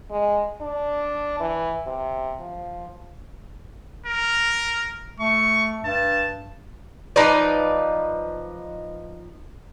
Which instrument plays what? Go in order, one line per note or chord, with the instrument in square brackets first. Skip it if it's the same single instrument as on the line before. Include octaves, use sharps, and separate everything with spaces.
[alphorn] G#3
D4
E3
C3
F3
[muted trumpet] A#4
[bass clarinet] A3 [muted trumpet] C#6
[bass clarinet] G2 [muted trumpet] A5
[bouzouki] F3 D#4 B4 D5